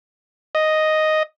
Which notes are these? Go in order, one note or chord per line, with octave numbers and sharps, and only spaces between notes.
D#5